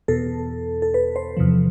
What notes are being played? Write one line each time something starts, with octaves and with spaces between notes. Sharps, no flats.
E2 B2 A4
A4
B4
C5
E2 C3 F3